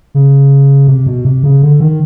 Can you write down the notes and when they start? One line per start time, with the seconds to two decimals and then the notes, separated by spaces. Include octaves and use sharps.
0.14 C#3
0.87 C3
1.06 B2
1.25 C3
1.43 C#3
1.62 D3
1.80 D#3